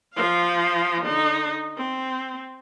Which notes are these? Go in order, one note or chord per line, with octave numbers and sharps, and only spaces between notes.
F3 F5
D3 D#4
C4